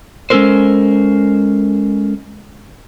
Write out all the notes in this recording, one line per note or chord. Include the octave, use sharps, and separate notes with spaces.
G#3 C#4 D4 A4 A#4 C5